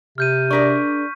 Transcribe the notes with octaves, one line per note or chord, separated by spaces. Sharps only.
C3 F6 G6 D#7
D4 G#4 A#4 D5 C#6 B6